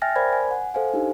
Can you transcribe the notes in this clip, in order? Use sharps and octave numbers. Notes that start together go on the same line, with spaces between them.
E5 G5 G#5 F6 A6 A#6
A#4 C5 D5 G#5 B5 G#6
G#5
F#5
A4 C5 F5 G#5
D4 D#4 G4